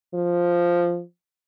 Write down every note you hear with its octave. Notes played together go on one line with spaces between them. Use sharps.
F3